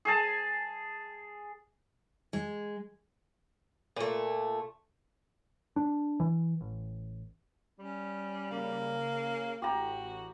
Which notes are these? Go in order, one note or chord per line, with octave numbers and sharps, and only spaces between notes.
G#4 G#5 A5
G#3
A#2 A3
D4
E3
A1
G3 C#4
C#3 A#3
A1 F#4 G4 A#5